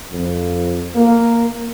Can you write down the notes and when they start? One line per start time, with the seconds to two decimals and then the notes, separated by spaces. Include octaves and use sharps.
0.12 F2
0.95 A#3